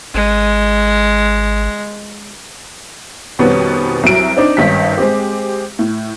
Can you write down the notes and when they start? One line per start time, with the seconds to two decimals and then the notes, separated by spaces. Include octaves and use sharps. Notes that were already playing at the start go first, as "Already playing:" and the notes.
0.15 G#1 G#3
3.39 F2 B2 D#3 G3 B3 C#4
4.03 C2 F#3 D7
4.37 C4 D4 D#4
4.57 G#1 G2 D#3 C#4 B6
4.98 G#3 C4 G4
5.79 A2